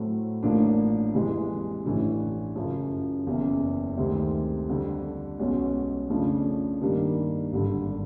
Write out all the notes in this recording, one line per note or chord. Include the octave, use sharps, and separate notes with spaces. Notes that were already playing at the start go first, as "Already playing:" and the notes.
Already playing: A2 F#3 A3 C4
A1 A2 F3 A#3 D4
F2 C3 E3 G#3
A1 A2 E3 A3 D4
F#2 C#3 F3
F#1 E2 C#3
D2 C3 D#3 G#3 C4
F2 D3 G3
B1 B2 G#3 C#4
F2 C#3 F3 A3 D4
G2 D#3 G3 A#3 D4
G#1 G2 D3